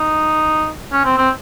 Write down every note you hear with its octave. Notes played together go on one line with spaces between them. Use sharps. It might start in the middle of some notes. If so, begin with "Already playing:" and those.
Already playing: D#4
C#4
C4
C4